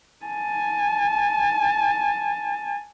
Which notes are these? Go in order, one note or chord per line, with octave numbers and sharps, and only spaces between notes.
G#5 A5